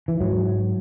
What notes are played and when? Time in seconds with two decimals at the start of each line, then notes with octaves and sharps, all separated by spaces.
0.08 E3
0.21 G#2 F#3